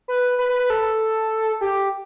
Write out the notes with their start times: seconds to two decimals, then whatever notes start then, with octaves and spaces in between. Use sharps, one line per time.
0.08 B4
0.39 B4
0.49 B4
0.59 B4
0.70 A4
1.61 G4